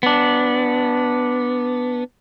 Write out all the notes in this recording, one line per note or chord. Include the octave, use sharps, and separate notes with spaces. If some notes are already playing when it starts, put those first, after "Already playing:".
B3 D4